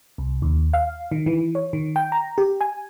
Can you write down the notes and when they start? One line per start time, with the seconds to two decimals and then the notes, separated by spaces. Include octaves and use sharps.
0.18 C2
0.42 D#2
0.73 F5
1.12 D#3
1.26 E3
1.55 C#5
1.73 D#3
1.96 G5
2.12 A#5
2.38 G4
2.61 G#5